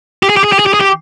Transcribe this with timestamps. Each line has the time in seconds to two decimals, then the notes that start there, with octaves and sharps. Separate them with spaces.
0.23 G4
0.30 G#4
0.37 G4
0.44 G#4
0.52 G4
0.59 G#4
0.66 G4
0.74 G#4
0.81 G4